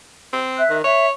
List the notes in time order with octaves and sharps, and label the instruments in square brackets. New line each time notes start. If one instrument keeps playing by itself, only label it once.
[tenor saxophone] C4
[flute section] E5 F#6
[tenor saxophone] D#3
[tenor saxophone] C#5 [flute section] E5